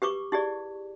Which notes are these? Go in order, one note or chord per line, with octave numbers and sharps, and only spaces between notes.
G4 B4 C#6 D6
E4 G4 G#4 D5